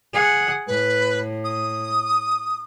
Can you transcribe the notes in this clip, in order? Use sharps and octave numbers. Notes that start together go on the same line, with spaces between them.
G#4 F#5
A2 B4
D#6